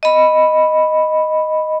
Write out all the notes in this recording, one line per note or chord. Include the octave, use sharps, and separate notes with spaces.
D#5 B5